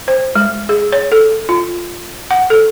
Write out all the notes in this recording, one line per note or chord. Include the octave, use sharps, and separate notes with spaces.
C5
G#3
G#4
C#5
A4
F4
F#5
A4